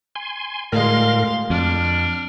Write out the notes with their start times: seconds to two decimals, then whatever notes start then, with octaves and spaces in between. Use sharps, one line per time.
0.16 G#5 C6
0.72 D2 A2 G#3 A#4 F5 C6
1.50 F2 D4 F6